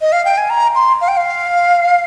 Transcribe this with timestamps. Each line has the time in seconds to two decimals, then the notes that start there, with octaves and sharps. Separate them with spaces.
0.00 D#5
0.12 F5
0.25 G5
0.38 G#5
0.50 A#5
0.75 C6
1.01 F5
1.08 G5
1.17 F5